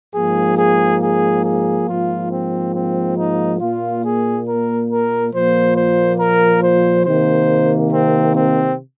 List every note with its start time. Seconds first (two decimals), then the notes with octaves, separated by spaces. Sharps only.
0.14 G#2 F3 A#3 G#4
0.58 G#4
1.02 G#4
1.45 G#4
1.88 G#2 F3 A#3 F4
2.32 C4
2.74 C4
3.17 D#4
3.60 A#2 A#3 F4
4.04 G#4
4.46 A#4
4.90 A#4
5.33 A#2 F3 A#3 C5
5.76 C5
6.20 A#4
6.62 C5
7.06 C3 D#3 A#3 C5
7.92 C4
8.36 C4